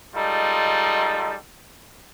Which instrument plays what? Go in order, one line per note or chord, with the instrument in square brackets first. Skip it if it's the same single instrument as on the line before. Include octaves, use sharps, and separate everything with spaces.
[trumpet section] G3 G#3 D#4 F4 A4